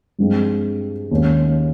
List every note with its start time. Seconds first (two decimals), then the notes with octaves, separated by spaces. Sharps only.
0.18 G2 F3 G#3 C4
1.11 D#2 D#3 A#3 C#4